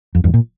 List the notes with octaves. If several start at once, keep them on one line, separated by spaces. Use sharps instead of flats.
F2
E2 G2
A#2